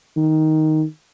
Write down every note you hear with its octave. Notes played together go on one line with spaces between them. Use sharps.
D#3